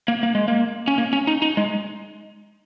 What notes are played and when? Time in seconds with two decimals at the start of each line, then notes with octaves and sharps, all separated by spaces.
0.08 A#3
0.23 A#3
0.35 G#3
0.48 A#3
0.88 C#4
0.98 A#3
1.13 C#4
1.27 D#4
1.42 D#4
1.57 G#3